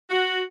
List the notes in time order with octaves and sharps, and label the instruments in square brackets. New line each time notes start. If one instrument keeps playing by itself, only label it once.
[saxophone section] F#4